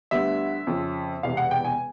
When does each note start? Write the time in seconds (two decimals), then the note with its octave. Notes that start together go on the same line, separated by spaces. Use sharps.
0.11 D2 D3 G3 B3 E5
0.67 F2 C#3 F3
1.23 E1 E2 C3 F5
1.37 F#5
1.51 G5
1.65 G#5